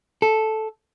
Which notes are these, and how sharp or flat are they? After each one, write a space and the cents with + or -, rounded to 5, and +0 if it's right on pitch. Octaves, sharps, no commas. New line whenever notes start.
A4 -5